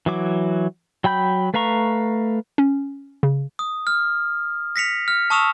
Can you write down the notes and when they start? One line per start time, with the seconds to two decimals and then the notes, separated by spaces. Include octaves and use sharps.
0.06 E3 F#3 D6
1.04 F#3 G5 B5 G6
1.54 A3 B4 F5 A#5 C#6
2.58 C#4
3.23 C#3
3.59 D#6
3.87 F6
4.76 A#6 B6 C#7 F7
5.08 F6
5.30 A5 C#6 D#6 E6 E7 F7